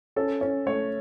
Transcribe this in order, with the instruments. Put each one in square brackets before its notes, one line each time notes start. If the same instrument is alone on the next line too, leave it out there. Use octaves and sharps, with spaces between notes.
[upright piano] C#4 [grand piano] A4
[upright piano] C#4
[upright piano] A3 [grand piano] C#5